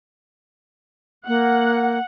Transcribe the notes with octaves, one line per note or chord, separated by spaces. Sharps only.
A#3 F#5